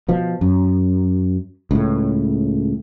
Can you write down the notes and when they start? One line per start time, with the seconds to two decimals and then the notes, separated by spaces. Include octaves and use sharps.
0.08 B2 F3
0.41 F#2
1.71 C#2 A2